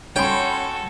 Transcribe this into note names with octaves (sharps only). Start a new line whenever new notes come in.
C#4 F#4 A4 G5 B5 C6